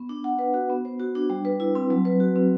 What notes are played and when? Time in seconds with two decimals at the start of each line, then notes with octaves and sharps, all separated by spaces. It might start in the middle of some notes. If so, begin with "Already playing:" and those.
Already playing: B3
0.09 D4
0.24 F#5
0.39 B4
0.54 F#4
0.70 B3
0.85 C5
1.00 F#4
1.15 D4
1.30 G3
1.45 B4
1.60 E4
1.75 C4
1.90 F#3
2.05 B4
2.20 F#4
2.36 C4